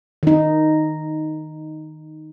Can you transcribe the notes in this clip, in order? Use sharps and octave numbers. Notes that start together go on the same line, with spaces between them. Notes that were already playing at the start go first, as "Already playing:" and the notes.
D#3 D#4